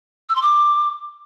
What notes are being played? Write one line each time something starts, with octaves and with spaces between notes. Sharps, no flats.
E6
C6
D6